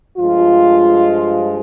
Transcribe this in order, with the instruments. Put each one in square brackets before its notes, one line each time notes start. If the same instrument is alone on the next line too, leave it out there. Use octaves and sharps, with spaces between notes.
[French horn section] G2 F3 G#3 F4